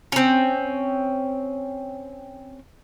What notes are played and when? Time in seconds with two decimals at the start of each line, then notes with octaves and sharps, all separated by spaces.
0.12 C4 C#4